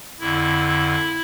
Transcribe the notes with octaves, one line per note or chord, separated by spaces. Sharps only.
F2 D3 E4